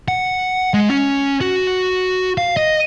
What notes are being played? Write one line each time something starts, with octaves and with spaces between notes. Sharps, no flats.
F#5
G#3
C#4
F#4
F5
D#5